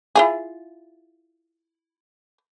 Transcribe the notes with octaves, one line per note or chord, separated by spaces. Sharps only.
E4 F4 G#4